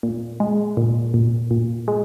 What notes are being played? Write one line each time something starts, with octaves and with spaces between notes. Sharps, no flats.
A#2
G#3
A#2
A#2
A#2
G#3